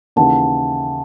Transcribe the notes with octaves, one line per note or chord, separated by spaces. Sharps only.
D#2 C#3 E3 F#5 A5